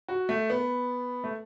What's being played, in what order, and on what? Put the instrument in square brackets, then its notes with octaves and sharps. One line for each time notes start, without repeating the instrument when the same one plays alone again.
[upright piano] F#4
A3
B3
A3